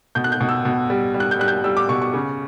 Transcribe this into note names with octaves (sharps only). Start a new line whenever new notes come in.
B2 G6
F#6
G6
B2
E6
B2
G3
G3
F#6
G6
G3 F#6
G6
G3 E6
D6
B2 C#6
C#6
C#3